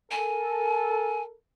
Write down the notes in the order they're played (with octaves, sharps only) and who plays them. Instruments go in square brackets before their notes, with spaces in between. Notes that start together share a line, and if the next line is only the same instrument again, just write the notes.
[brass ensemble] A4 A#4 [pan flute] G#5